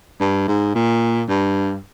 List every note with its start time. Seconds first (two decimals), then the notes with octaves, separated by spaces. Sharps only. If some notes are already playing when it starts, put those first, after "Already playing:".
0.20 G2
0.48 G#2
0.75 A#2
1.28 G2